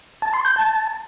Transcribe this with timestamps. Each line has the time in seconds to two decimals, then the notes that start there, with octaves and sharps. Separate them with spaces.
0.22 A5
0.33 C6
0.45 G6
0.56 A5